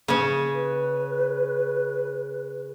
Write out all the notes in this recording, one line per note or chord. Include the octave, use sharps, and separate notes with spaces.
C#3 C#4
B4